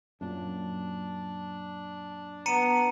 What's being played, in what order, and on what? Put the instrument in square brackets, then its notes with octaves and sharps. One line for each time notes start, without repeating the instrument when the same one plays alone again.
[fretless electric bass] F#2 A#2 [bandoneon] D4
[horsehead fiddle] B3 [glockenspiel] A#5 C#7 D#7